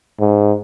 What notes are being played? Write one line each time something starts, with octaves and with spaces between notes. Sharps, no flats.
G#2